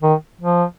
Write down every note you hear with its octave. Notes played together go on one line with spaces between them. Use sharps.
D#3
F3